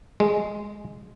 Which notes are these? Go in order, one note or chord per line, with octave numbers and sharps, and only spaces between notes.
G#3